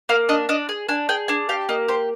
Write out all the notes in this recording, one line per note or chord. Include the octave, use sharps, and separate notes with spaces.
A#3 F5
D4 D#5
D4 D#5
G#4
D4 G#5
G#4 G5
D4 G#5
G4 F5
A#3 D#5
G4 C5